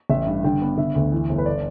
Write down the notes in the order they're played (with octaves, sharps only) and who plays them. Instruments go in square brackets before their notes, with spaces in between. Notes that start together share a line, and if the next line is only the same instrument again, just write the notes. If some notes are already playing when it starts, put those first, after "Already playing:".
[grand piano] A1 E5
G2
D3 G5
B3
D3 E5
D2
E3
G1
B4
D5